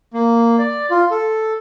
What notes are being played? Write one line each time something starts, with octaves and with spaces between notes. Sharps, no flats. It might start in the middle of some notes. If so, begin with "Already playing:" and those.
A#3
D5
F4
A4